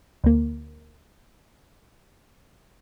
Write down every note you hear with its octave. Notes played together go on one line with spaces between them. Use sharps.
D2 A#3